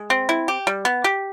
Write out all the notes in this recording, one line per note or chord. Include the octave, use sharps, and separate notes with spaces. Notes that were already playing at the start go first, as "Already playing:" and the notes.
Already playing: G#3
C4
E4
G4
G3
B3
G4